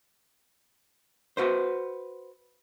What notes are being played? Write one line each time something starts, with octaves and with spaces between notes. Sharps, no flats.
F#4 B4 C5